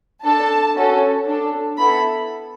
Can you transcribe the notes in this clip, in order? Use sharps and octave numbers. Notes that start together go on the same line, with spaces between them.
D4 A4 A5
C#4 F#4 A4
D4 A4
B3 E4 A4 B5